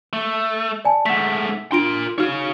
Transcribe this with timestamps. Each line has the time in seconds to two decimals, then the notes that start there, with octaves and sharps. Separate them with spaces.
0.13 A3
0.85 D5 G#5 A5
1.06 G#2 A3 F#5 B6
1.72 D4 F4 A#4 C6 D7
2.18 D#4 F#4 C#5 F5 F6